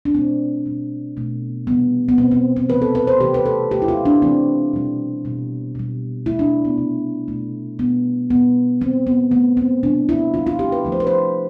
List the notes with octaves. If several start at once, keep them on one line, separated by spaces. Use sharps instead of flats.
D4
B2 A3 C4
B2 G3
B2 A3
C3 E3 G3 B3
B3
B2 G3 C4
C4
C4
C3 E3 A3 B4
A4
B4
C5
C3 E3 A3 G4
B4
A4
D3 A3 G4
E4
F4
D4
C3 E3 A3 C4
B2 G3
B2 G3
B2 G3
D3 A3 E4
D4
B3
C3 G3
B2 A3
B2 G3 B3
B2 G3 B3
D3 G3 C4
B3
D3 A3 B3
C4
C3 G3 D4
E4
D3 G3 F4
F4
G4
B4
D3 F3 A3
C5
B4
C5